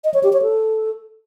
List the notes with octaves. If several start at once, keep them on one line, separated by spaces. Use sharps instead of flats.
D#5
C#5
G4
C#5
A4